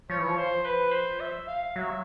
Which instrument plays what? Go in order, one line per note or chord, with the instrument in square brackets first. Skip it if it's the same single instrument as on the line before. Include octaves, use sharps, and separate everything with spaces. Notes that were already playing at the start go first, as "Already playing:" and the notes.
[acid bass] F3 [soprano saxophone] C#5
[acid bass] E3
F3
[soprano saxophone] C5
B4
C5
E5
F5
[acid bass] F#3 [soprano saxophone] E5